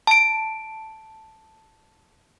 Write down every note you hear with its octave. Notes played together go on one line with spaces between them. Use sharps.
A5 D7